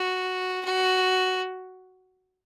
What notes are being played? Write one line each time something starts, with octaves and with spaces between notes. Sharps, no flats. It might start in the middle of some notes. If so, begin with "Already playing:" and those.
Already playing: F#4
F#4